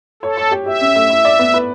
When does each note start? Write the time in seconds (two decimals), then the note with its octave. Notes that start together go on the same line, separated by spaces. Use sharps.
0.23 A4 C#5
0.37 C#5
0.51 G4
0.66 G4 E5
0.81 C#4
0.96 A3
1.10 E4
1.25 D5
1.39 B3
1.54 B4